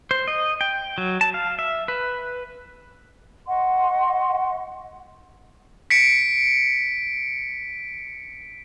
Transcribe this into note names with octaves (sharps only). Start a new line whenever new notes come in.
C5
D#5
G5
F#3
A5
F5
E5
B4
D#5 F#5 C6 C#6
B6 C#7 D7